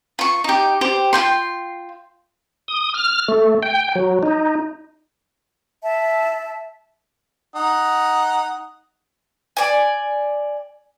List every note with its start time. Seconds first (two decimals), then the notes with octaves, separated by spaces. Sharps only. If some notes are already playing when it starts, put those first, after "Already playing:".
0.19 F4 C#6
0.44 D#4 G4
0.81 G4 C5
1.13 F4 G5 C6
2.68 D#6
2.94 F6
3.28 A3
3.63 G5
3.95 F#3
4.23 D#4
5.83 E5 A5
7.55 D#4 F#5 D#6
9.57 D5 G#5